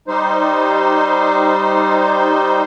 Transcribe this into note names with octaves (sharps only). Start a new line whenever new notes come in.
G3 D#4 C5